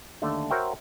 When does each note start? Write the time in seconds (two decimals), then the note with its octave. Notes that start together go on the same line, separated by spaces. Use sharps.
0.22 D#2 D3 A3
0.50 F#4 A#4 C5 C#5 E5 G5